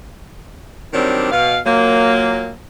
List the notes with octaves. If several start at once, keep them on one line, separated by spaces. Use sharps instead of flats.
D#3 F#3 G3 C4 D4
B2 F5
A#2 F#3 A#3